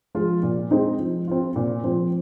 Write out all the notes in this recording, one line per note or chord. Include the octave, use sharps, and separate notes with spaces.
F3 G#3 F4
A#2
G#3 C4 D#4
F3
C4 F4
A#2
F3 C4